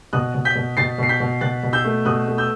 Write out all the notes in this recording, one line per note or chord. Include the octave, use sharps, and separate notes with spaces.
B2 D#6 F#6
B2
G6 B6
B2
B2 A6 C7
B2 C7
G6 B6
B2
B2 F#6 A6
B2
E6 G6
A3
B2 D#6 F#6
A3
E6 G6